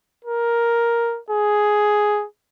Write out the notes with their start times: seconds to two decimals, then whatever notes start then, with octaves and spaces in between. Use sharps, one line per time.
0.25 A#4
1.30 G#4